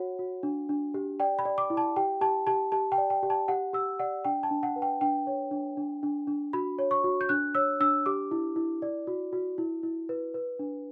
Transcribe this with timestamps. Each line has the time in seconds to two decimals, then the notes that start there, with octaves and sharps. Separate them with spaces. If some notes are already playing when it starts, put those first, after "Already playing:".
Already playing: F#4 C#5 F#5
0.19 F#4
0.43 D4
0.69 D4
0.94 G4
1.20 D5 G5
1.39 B5
1.45 D5
1.58 D6
1.70 E4
1.77 A5
1.96 G4 G5
2.21 G4 A5
2.47 G4 A5
2.72 G4 A5
2.92 G5
2.98 D5
3.10 G5
3.23 G4
3.30 A5
3.48 G4 F#5
3.73 G4 E6
3.99 D5 F#5
4.25 D4 G5
4.43 A5
4.51 D4
4.63 F#5
4.76 B4
4.82 G5
5.01 D4 G5
5.27 C#5
5.51 D4
5.77 D4
6.03 D4
6.27 D4
6.53 F#4 B5
6.79 C#5
6.91 C#6
7.04 F#4
7.21 G6
7.29 D4 F#6
7.55 C#5 E6
7.80 D4 E6
8.06 G4 D6
8.31 E4
8.56 E4
8.82 D5
9.07 F#4
9.33 F#4
9.58 E4
9.83 E4
10.09 B4
10.34 B4
10.59 D4